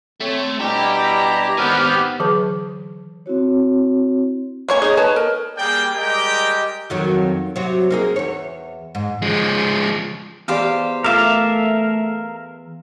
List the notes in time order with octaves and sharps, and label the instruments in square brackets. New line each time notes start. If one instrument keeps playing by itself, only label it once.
[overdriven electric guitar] A3 [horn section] C4 C#5
[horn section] B2 G3 E4 [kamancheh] D4 A#5 [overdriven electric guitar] G4
[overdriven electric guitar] D#3 C4 [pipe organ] B3 G4 F6
[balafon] D3 E3 F#3 G#4 B4 A5
[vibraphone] C4 E4 F#4 C#5
[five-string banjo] A#3 C#5 G#5
[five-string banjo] D#4 [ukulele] G#4 C#5
[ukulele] B4 C#5 A5
A#4
[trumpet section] G3 A#3 G#4 D5 G5
G3 G#3 G4 A#4 D#5 G5
[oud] F2 D#3 F#3
C3 F#3 F#4
A#3 D#4 G#4
E2 C#5
G#2
[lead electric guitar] F3 G#3
[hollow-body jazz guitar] E2 D5 [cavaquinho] G4 C5 F5
[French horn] A3 [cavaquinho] F4 D6 [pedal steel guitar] A#4 E5 F5